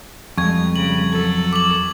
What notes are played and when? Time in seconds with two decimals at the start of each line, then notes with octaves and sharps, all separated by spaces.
0.38 F2 G3 G#3 C#6 G#6
0.76 C#3 G3 F#7
1.12 F#3 A4
1.53 D6 F#7